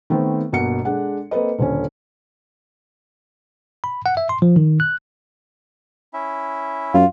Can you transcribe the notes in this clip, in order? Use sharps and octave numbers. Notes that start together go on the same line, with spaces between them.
D#3 A3 B3 C4
G1 B2 A#3 F#5 C#7
G#3 D4 A4 F#5
A#3 C4 A4 B4 D#5
D#1 D3 C#4
B5
F#5
E5
C6
F3
D#3
F#6
C#4 E4 E5
F#2 F4